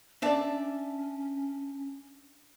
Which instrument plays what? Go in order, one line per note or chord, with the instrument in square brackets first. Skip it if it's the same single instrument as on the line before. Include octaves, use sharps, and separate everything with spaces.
[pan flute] C#4 [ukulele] D4 D5 [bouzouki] E5 A5